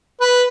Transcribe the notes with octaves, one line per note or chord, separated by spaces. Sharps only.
B4